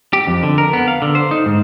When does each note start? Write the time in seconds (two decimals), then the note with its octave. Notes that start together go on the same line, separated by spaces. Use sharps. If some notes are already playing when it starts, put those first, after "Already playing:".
0.13 G4
0.27 F2
0.43 D3
0.58 A#4
0.73 B3
0.88 F5
1.02 D3
1.15 C5
1.31 D#4
1.46 G#2